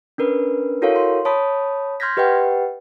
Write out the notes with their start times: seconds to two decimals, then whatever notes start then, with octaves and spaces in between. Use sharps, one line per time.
0.18 C#4 D4 A#4 B4
0.82 E4 F#4 A4 A#4 C#5 F5
0.96 C6
1.25 C#5 A5 B5 D#6 B6
2.00 C6 F6 G6 G#6 A#6 B6
2.17 G4 B4 D#5 F#5 G5